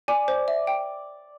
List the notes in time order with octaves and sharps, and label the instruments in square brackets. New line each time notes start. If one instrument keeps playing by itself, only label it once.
[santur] D5 [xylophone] G#5
[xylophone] C5
E5
G5